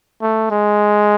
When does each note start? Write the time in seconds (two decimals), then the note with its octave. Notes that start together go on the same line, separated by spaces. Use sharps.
0.22 A3
0.51 G#3